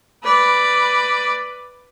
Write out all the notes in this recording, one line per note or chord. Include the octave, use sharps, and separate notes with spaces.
B4 D5